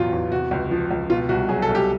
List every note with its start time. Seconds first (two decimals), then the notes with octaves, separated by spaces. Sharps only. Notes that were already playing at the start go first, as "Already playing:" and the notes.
Already playing: A1 E2 B2 F#3 F4
0.13 E2
0.31 C3 F#4
0.51 C#2
0.71 F3
0.91 C#2
1.10 B2 F4
1.29 C2 F#4
1.49 F#3 G#4
1.62 A4
1.69 C2
1.75 G4